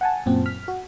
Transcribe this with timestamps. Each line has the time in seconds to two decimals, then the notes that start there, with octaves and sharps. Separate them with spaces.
0.01 F#5 G#5 A5
0.26 F#2 A#2 C4
0.46 F6 B6
0.68 F#4